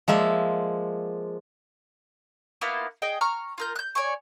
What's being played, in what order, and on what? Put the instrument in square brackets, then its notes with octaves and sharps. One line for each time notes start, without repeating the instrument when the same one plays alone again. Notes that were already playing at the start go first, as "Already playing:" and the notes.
[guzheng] F3 G#3 A#3 E5
[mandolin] A#3 B3 E4 F4
G#4 D#5 G5
A#5 C#6 F6
F4 A#4 G6
F#6 G6
C#5 D5 G#5 C#6